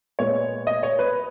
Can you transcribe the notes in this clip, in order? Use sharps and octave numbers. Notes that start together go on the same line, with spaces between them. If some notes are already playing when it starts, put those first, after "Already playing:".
A#2 G#3 B3 C#5
D#5
C#5
B4